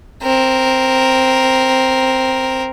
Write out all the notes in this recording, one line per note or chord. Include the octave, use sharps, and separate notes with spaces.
C4 A#4